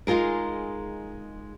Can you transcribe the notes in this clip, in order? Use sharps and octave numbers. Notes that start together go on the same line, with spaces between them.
G#3 D#4 F4 G#4 A#4